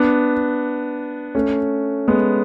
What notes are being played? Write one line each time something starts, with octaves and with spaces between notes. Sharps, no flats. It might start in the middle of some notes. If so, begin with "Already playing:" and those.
Already playing: B3 D4
A3 C#4
G#3 B3